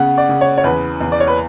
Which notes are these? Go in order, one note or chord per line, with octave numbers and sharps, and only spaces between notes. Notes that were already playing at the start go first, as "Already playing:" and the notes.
Already playing: C#3 B3 F#5
D5
C#3
C#5
C#5
E2 B4
E2
D5
C#5
B4